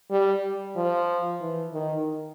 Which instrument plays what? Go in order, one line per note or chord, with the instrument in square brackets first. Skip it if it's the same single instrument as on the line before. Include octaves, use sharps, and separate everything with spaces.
[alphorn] G3
F3
E3
D#3